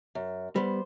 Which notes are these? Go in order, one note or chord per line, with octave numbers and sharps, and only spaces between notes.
F#2
G3 B3 C5